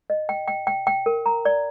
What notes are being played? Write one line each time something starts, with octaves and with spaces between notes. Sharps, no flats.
D#5
G5
G5
G5
G5
A#4
A#5
D5